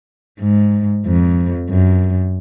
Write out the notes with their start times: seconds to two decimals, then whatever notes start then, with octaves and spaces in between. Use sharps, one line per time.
0.41 G#2
1.06 F2
1.70 F#2